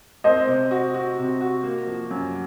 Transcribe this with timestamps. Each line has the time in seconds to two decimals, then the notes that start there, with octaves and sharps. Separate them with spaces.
0.24 C4 C5 D#5
0.47 C3
0.71 F#4
0.94 F#4
1.18 C3
1.41 F#4
1.63 A#3
1.87 F3
2.10 F#2